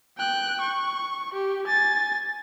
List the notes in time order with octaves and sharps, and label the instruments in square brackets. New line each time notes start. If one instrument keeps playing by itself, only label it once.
[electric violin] G5 F#6
C#6
G4
G#5 A6